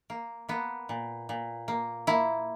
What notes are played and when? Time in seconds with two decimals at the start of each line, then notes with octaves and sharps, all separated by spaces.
0.10 A#3
0.49 A#3 B3
0.89 A#2
1.29 A#2
1.68 A#3
2.07 A#3 E4